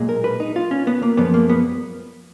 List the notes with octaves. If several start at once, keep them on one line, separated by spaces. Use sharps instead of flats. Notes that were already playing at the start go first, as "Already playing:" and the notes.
Already playing: B1 A#2 G#3
A#4
B4
D#4
F4
C#4
B3
A#3
F#2 F3 G#3 B3
A#3
B3